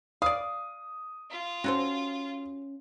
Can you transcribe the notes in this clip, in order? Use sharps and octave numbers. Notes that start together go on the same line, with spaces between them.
D5 F5 D#6
F4
C#4 F#4 A4 C5